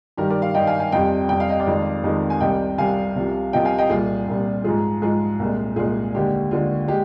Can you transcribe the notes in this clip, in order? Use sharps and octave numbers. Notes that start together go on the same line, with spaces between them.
G2 D#3 G3 G4 A#4
A#4 D5
D5 F5
G2 D#3 G3 D#5 G5
F5 G#5
F5 G#5
F2 C3 G3 D#5 G5
F2 C3 G3 G5
F5
D#5
D5 F5
F2 D#3 G#3
F2 D#3 G#3
G#5
C2 C3 G3 D#5 G5
C2 C3 G3 F5 G#5
C2 C3 F3
C2 C3 F3 D#5 G5
F5 G#5
D#5 G5
C2 A#2 G3 F4 G#4
C2 A#2 G3
G#2 F3 G#3 F4 G#4
G#2 F3 G#3 F4 G#4
C2 A#2 G#3
C2 A#2 G#3 F4 G#4
D#2 D3 G#3 G4
D#2 D3 G#3 F4
G#3 G4